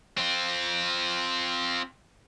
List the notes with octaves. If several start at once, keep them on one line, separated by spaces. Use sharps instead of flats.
C4 F4